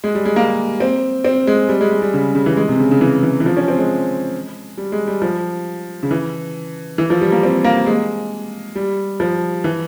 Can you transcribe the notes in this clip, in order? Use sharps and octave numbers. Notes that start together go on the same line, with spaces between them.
G#3
G3
G#3
A#3
C4
C4
G#3
G3
G#3
G#3
G3
C#3
C#3
E3
G#3
C3
C#3
C#3
E3
E3
E3
F3
C#4
C4
G#3
G3
G#3
G3
F3
C#3
E3
E3
F3
G3
A#3
C4
A#3
G#3
G3
F3
E3